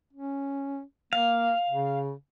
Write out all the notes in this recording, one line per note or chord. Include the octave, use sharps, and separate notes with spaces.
C#4
A#3 F5
C#3